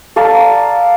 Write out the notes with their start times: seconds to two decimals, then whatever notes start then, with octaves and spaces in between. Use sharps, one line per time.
0.16 A4 D5 F5 A#5